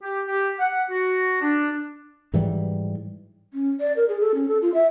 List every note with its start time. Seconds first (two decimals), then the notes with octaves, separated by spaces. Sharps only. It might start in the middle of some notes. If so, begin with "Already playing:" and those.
0.02 G4
0.27 G4
0.59 F#5
0.90 F#4
1.41 D4
2.34 G#2 E3 F#3 G3
3.53 C#4
3.80 D5
3.96 A#4
4.09 G#4
4.21 A4
4.35 C#4
4.48 A4
4.62 F4
4.74 E5